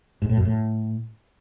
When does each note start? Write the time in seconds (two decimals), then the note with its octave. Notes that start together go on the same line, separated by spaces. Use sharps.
0.22 G#2
0.29 A2
0.37 F#2
0.45 A2